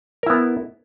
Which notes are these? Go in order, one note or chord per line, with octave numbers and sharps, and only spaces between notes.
B3 E4 A#4